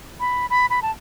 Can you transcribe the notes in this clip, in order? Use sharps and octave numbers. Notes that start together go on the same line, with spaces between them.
B5
B5
B5
A5